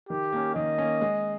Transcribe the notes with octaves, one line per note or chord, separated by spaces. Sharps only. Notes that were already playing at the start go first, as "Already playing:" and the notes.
D#3 G4
A#3 C#4
D#3 D#5
A#3 C#4
G#3